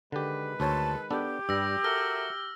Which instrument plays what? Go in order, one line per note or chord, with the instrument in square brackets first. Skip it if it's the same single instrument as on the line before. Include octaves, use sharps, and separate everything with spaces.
[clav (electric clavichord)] D3 G4 [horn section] D#3 G#3 B4
[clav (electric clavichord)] D2 C5 C#5 [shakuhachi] A5
[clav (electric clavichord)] B3 D4 A4 [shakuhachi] G4
[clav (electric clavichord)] G2 [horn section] G3 [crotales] E6 A#6
[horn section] F#4 A#4 E5 [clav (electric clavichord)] A4 [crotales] F6 A#6 G7